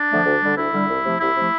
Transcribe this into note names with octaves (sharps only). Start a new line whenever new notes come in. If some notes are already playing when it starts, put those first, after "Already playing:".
Already playing: D4
D3 F3 A3
D2
D3 G3
D2 E4
D3 G3
C2
C3 F3 A3
C2 E4
C3 F3 A3